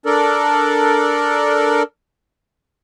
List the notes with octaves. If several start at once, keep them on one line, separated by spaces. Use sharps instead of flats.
D4 A4 A#4 D5